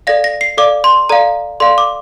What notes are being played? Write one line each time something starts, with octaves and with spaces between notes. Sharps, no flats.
A4 D5 F5 A#6
A#6
C7
A4 D5 F5 D6
C6
A4 D5 F5 A#5
A4 D5 F5 C6
D6